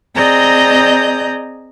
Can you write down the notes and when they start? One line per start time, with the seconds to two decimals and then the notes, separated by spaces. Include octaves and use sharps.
0.15 C4 G#4 D5 D#5 A#5 G6